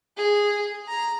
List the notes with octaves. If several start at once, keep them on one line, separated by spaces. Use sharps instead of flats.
G#4
A#5